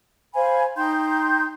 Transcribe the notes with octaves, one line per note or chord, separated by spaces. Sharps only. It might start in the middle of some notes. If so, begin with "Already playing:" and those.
C5 F5 G#5 B5
D#4 G5 C6 G6